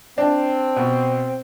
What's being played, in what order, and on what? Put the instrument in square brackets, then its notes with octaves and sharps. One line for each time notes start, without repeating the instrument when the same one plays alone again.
[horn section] C4 [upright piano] D4
[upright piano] B2